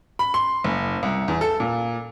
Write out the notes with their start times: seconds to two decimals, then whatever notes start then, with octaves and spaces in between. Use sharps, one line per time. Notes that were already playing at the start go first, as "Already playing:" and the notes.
0.19 B5
0.34 C6
0.64 F#1
1.03 C2
1.28 E2
1.41 A4
1.60 A#2